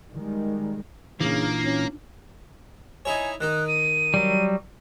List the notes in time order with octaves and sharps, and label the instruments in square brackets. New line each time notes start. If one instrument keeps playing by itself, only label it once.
[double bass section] D#3 G3 G#3
[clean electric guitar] A#2 E3 [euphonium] C#3 [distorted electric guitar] A#3 [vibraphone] D4 D#4 F4
[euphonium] C#4
[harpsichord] D#4 E4 C#5 [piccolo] G#5
[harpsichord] D#3 D#4 [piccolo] F#6
[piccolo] D#7
[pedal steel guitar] F#3 G3